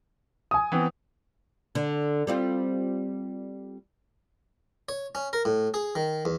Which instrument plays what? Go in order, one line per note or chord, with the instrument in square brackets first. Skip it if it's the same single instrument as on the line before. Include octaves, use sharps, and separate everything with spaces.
[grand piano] G#5 D#6
[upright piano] E3 B3 C4
[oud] D3
G3 C4 F4
[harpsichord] C#5
C#4
A#4
A2
G#4
D#3
E2